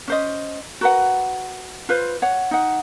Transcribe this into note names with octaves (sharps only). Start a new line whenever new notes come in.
C#4 C5 D#5
F#4 A#4 B4 F#5
F4 B4 C5
C#5 F#5
D#4 F#5